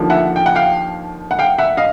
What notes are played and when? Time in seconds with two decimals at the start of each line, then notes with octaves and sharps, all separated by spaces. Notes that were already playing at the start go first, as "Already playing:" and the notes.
Already playing: D#2 D3 F3
0.10 E5 F#5
0.36 G5
0.46 F#5
0.55 F5 G5
1.31 F#5
1.39 F5 G5
1.58 E5 F#5
1.77 D#5 F5